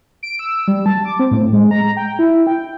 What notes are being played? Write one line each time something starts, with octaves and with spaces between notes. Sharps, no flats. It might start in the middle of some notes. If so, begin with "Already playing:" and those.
D7
E6
G3
A5
D6
C4
A2
G#3
A#5
G5
E4
G5